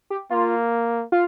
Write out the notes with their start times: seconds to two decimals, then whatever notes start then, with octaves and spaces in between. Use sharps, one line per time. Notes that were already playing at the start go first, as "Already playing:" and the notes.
0.10 G4
0.30 A#3 F4
1.12 F4